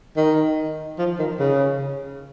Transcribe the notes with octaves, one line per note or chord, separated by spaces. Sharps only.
D#3
F3
D#3
C#3